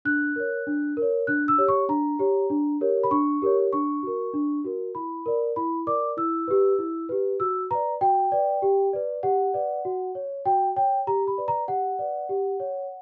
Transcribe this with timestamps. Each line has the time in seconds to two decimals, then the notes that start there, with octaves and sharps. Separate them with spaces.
0.05 D4 F#6
0.36 A#4 C#5
0.67 D4
0.97 A#4
1.02 C#5
1.27 D4 F#6
1.48 E6
1.58 G4 C#5
1.68 C#6
1.89 D4 A#5
2.19 G4 C#5
2.50 D4
2.81 G4 A#4 C#5
3.03 B5
3.11 D4 C#6
3.42 G4 A#4 C#5
3.73 D4 C#6
4.03 F#4 A#4
4.34 D4
4.65 F#4 A#4
4.95 E4 B5
5.26 A#4 D5
5.56 E4 B5
5.87 A#4 D5 D6
6.17 E4 E6
6.48 G4 B4
6.78 E4
7.09 G4 B4
7.40 F#4 E6
7.71 B4 D5 A#5
8.01 F#4 G5
8.32 B4 D5
8.62 G4
8.93 B4 D5
9.23 G4 F#5
9.54 B4 D5
9.85 F#4
10.15 C#5
10.45 F#4 G5
10.76 C#5 G5
11.07 G4 A#5
11.28 B5
11.38 B4 D5
11.48 A#5
11.68 G4 F#5
11.99 B4 D5
12.29 G4
12.60 C#5